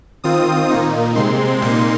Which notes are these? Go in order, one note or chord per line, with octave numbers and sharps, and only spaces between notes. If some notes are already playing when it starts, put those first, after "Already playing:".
D#3 C4 F4 D#6
A#2 A#3 D#4
C3 G#3 C4 C6
A#2 A#3 D#4 C6